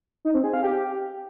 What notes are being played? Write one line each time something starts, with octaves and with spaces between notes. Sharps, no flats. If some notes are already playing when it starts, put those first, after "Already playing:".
D#4
C4
G#4
F5
G4